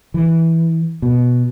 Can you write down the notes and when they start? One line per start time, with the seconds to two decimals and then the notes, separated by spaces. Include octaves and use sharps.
0.14 E3
1.02 B2